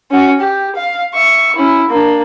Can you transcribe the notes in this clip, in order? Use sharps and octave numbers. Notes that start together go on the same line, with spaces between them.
C#4 F#4
G4
F5
E5 C#6
C#4 E4
A#3 D4